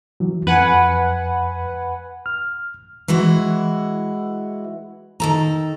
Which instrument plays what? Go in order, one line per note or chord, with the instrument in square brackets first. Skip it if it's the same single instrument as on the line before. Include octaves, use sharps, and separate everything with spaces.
[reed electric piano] E3 F#3
[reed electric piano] F2 [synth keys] B4 F#5 G#5
[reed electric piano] F6
[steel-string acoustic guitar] E3 G#3 E4 F#4
D#3 A4 A#5